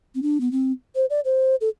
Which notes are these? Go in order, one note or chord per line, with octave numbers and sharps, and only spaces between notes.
C4
D4
B3
C4
C5
D5
C5
A4